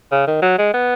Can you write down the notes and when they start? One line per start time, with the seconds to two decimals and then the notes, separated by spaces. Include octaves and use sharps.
0.12 C#3
0.27 D#3
0.42 F#3
0.58 G#3
0.74 B3